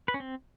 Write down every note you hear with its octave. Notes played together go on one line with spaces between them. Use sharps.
B4
C#4
C4